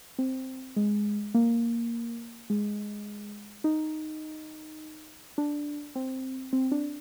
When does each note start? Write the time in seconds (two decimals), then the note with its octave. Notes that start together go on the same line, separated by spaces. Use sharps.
0.19 C4
0.76 G#3
1.34 A#3
2.50 G#3
3.64 D#4
5.38 D4
5.95 C4
6.53 C4
6.72 D4